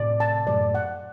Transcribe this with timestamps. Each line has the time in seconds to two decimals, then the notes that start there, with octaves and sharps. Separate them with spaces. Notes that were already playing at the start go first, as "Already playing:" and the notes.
Already playing: A2 C3 D5
0.20 A5
0.47 F#2 A2 D5
0.75 F#5